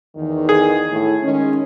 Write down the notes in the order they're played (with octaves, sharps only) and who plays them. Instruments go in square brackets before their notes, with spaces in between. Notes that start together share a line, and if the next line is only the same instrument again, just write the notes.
[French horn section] E2 D#3
[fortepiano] G#4
[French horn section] A2
D#3 G#3 C#4